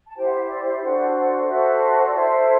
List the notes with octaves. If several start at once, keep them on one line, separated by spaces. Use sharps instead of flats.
A5
E4 G4 C5 G5
F#5
E5
D5
E5
D4 F#4 A4 C5 D5 F#5
D5 F#5
F#4 A4 C5 E5
D5
E4 A4 C5 E5
E5